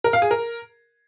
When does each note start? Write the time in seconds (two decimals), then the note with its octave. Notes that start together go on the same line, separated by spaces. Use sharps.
0.04 A#4
0.13 F5
0.22 G#4
0.31 A#4